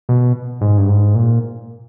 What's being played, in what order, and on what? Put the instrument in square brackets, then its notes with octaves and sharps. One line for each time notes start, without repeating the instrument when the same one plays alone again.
[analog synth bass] B2
G#2
G2
G#2
A#2